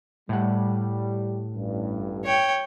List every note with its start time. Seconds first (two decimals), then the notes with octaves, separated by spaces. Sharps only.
0.29 A2 G3 F#5
1.55 A1 G2
2.25 C#5 G5